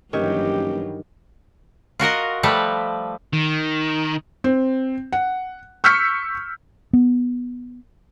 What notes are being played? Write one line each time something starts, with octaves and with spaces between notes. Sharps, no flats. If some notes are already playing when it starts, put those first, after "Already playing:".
F#1 G2 D#3 E3 F#3 G4 C#5 E5
F4 F#4 A#4 D#5
F3 G3 A3 A4 B4
D#3
C4
F#5
C#6 E6 F6 G6 B6 C#7
B3